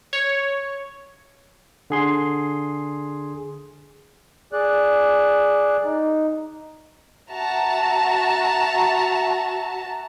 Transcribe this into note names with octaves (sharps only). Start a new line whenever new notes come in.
C#5
D3 G#4 C6
G#4 D5 F#6
D#4
F#4 E5 A5 A#5